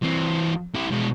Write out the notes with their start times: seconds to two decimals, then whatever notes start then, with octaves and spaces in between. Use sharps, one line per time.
0.03 E3 C4
0.75 E4 G4
0.91 B2 G#3